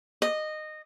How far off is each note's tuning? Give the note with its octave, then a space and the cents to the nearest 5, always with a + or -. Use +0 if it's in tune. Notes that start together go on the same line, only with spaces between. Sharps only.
D#5 -15